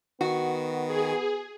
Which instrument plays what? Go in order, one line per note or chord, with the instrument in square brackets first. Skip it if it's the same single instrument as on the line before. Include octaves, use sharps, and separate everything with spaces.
[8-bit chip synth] D#3 [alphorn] B3 [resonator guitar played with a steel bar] F#4
[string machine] G#4